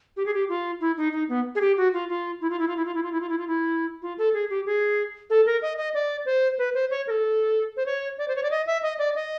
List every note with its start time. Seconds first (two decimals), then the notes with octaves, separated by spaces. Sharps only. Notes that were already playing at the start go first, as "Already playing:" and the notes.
0.17 G4
0.26 G#4
0.34 G4
0.49 F4
0.81 E4
0.97 D#4
1.12 D#4
1.29 B3
1.55 G#4
1.61 G4
1.77 F#4
1.93 F4
2.09 F4
2.41 E4
2.50 F4
2.59 E4
2.68 F4
2.77 E4
2.85 F4
2.95 E4
3.03 F4
3.12 E4
3.21 F4
3.29 E4
3.38 F4
3.47 E4
4.02 F4
4.18 A4
4.34 G#4
4.50 G4
4.66 G#4
5.30 A4
5.46 A#4
5.62 D#5
5.78 D#5
5.94 D5
6.26 C5
6.58 B4
6.74 C5
6.91 C#5
7.07 A#4
7.10 A4
7.77 C5
7.86 C#5
8.18 D5
8.28 C5
8.36 C#5
8.43 D5
8.51 D#5
8.67 E5
8.83 D#5
8.99 D5
9.15 D#5